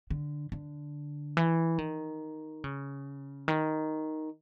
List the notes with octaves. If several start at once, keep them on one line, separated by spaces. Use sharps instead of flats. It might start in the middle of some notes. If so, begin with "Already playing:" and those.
D3
D3
E3
D#3
C#3
D#3